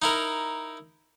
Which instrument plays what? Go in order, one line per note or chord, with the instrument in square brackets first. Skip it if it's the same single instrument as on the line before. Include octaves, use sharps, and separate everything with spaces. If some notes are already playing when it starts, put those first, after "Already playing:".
[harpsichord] D#4 E4 A#4